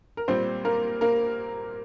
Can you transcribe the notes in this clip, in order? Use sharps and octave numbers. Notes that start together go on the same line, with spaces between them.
A#4
A#2 G3 C4 C5
A#3 A#4
A#3 A#4